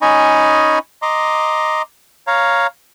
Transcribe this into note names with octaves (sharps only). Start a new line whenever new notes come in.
C#4 D#4 D#5 G#5 B5 C#6
D#5 A#5 C6 D6
C#5 F5 A#5